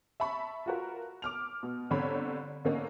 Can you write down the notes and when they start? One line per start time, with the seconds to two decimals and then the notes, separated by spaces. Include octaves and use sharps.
0.20 E5 A5 B5 C#6
0.66 F4 F#4 A#4
1.22 D6 F6 F7
1.63 B2
1.90 G1 D3 C4 C#5 B5
2.65 D3 A#3 C#4 D#4